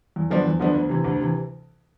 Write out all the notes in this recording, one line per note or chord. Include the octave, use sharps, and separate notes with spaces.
E2
D3 F3 B3 D4
E2
D3 F3 B3 D4
D2
C3 E3
D2
C3 E3